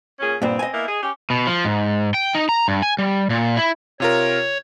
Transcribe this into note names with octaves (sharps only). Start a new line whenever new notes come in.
A#2 C#4 G#4
G2 A#2 B3 C4
D#5 G#5
A#3 B3 E4
G#4
C#4 G4
B2
F3
G#2
G5
D#4
A#5
G2
G#5
G3
A#2
E4
C3 F4 A#4 C#5